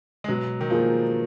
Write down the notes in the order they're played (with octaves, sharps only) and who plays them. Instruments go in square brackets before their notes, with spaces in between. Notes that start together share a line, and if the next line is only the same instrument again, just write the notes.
[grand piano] G#3
[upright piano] B2 [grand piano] F#3
[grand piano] D#3
[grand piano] F3 [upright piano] A#3 F4 G#4